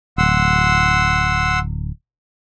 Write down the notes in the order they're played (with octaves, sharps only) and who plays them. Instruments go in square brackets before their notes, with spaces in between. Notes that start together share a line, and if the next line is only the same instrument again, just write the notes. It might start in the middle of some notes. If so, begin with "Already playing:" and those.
[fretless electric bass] D1 [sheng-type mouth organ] F#5 C6 E6